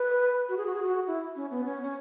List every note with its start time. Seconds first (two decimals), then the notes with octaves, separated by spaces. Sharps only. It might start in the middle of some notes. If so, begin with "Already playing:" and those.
Already playing: B4
0.49 F#4
0.57 G#4
0.66 F#4
0.75 G#4
0.83 F#4
1.07 E4
1.36 C#4
1.51 B3
1.65 C#4
1.82 C#4